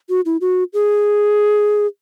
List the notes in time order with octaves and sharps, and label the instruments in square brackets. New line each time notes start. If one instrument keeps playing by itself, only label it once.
[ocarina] F#4
E4
F#4
G#4